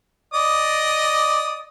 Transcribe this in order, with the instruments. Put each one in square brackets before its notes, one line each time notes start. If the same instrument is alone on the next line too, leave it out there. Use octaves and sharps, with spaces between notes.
[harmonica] D5 D#5 D#6